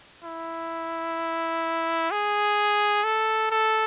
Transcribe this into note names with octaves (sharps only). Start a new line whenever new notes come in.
E4
G#4
A4
A4